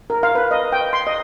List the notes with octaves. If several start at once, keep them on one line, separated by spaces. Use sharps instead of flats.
A#4
F5
B4
D#5
G5
C6
D#5